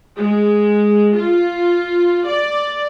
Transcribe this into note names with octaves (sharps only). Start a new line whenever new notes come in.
G#3
F4
D5